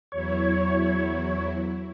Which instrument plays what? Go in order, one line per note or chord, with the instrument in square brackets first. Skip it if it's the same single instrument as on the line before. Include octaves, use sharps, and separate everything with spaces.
[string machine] E2 F#3 E4 [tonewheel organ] C#5